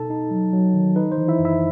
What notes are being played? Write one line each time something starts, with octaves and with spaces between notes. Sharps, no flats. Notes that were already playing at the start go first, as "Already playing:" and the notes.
Already playing: B2 D#4 A4 A5
D#4
F#3
F#3
D#3
D#4 B4
C5
E3
E4 E5
F#2
E4 E5